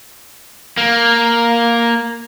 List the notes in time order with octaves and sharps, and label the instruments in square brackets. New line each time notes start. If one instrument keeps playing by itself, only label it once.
[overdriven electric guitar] A#3